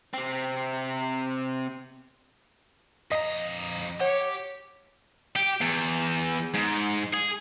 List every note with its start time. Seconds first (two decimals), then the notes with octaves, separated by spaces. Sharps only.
0.14 C3 C4
3.12 F2 D#5 A#5
4.00 G4 C#5 F#5
5.36 G4
5.61 E2
6.54 G#2
7.13 G#4